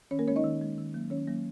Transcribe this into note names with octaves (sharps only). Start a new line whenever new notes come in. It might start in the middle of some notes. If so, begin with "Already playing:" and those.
D#3 C#4 C#5
A#3 A#4
G#3 C#4 C#5
D#4 D#5
D#3
G#3
D#3
F#3 A#3
D#3 C#4 C#5
F#3 A#3